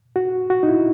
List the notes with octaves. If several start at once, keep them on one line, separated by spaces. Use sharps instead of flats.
F#4
F#4
D#4
E4